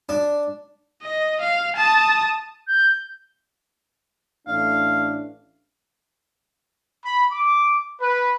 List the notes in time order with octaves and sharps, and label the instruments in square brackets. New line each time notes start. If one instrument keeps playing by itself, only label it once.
[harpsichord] D4
[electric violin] D#5
F5
A5 D#6
[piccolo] G6
[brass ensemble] A1 A3 D4 [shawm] F5
[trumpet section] B5
D6
B4